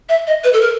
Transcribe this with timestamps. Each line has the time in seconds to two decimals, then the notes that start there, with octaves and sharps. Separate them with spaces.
0.09 E5
0.27 D#5
0.44 B4
0.53 A4
0.61 A#4